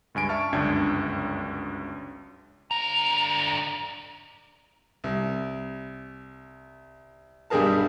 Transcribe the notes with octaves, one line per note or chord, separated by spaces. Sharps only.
C#2 G2 G#5 D7
E5 A5 C#6 F6
G1 C#2 F#2 D4 G5 G#6
D3 A#5
C2
B1 G2 G3 G#4 A#4 A5